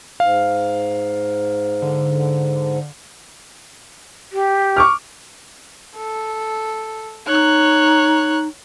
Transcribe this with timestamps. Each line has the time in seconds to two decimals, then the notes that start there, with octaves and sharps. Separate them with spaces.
0.20 G#2 F5
1.82 D3
4.32 G4
4.76 C#6 D6 F6
5.96 A4
7.27 D#4 C#5 F#6